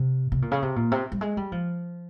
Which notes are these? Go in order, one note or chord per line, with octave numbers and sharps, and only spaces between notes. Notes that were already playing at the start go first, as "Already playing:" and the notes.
Already playing: C3
C3
A#2
C#3
C3
A#2
C3
G3
G#3
G3
F3